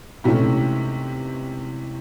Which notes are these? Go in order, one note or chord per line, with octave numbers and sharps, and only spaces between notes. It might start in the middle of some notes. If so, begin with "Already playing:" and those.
G#2 C3 E3 A3 C#4